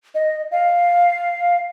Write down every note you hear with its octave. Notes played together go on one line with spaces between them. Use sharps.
D#5
F5